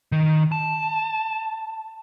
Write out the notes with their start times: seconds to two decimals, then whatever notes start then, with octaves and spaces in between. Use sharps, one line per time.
0.12 D#3
0.52 A5